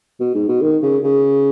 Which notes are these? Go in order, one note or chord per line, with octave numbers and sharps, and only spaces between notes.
B2
G#2
B2
D#3
C#3
C#3